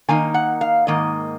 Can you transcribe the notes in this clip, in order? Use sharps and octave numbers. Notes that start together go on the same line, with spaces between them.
D#3 A#3 D#4 G#5
F#5
F5
G#2 D#3 A#3 D#5